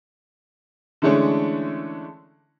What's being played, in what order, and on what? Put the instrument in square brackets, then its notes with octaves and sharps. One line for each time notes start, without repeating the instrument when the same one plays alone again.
[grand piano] D3 E3 G#3 A3 C#4 D4